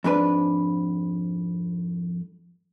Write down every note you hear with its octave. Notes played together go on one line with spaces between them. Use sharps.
F2 G#2 D4 B4